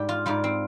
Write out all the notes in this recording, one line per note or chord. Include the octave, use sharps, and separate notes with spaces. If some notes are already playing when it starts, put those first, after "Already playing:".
Already playing: G#2 G3 G4
F4
G#2 G3 F4
C4